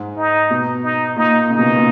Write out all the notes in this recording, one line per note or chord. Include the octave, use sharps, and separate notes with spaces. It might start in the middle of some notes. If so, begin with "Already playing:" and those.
Already playing: G#2
D#4
B2
D#4
A#2 D#4
C#3 D#4
B2
A#2